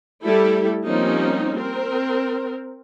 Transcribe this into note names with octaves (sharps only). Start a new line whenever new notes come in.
G3 A3 E4 G4 A4
F3 G3 A#3 C4 C#4 D#4
C4 A#4